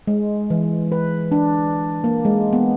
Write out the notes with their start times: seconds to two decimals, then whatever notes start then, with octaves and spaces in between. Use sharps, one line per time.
0.07 G#3
0.50 E3
0.92 B4
1.32 D4
2.04 A#3
2.25 G#3
2.53 B3